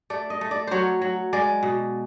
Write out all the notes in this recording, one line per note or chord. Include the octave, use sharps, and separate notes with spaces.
A3 D5
D#5
A3
D5
F#3 C5 C#5
F#3
G#3 D5
B2